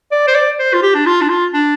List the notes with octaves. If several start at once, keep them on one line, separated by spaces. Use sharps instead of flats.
D5
C5
D5
C5
F4
G4
D4
F4
D4
F4
D4